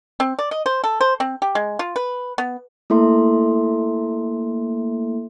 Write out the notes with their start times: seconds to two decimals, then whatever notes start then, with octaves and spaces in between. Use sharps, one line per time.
0.20 C4
0.39 D5
0.51 D#5
0.66 C5
0.84 A4
1.01 C5
1.20 C4
1.42 G4
1.55 G#3
1.79 F4
1.96 B4
2.38 B3
2.90 A3 A#3 E4 A4 E5 C6